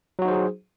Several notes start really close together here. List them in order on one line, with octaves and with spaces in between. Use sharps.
F#3 F#4 D#4 C5 G#4